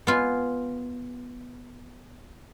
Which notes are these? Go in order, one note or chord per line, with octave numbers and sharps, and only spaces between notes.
B3 F4 G#5